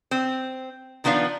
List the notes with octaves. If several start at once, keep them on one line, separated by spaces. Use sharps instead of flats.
C4
D#3 F3 B3 D4 F5